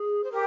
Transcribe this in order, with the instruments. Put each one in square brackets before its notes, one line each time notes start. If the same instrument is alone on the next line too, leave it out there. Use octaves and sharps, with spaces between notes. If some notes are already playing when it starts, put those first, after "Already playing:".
Already playing: [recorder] G#4
C5
[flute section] G4 [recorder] A#4